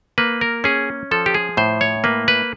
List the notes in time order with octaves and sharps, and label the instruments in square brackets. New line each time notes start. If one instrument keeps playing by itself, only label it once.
[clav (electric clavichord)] A#3 B4
A#4
C#4 G#4
F3 A4
G4
G#4
A2 C5
C#5
A#3 B4
B4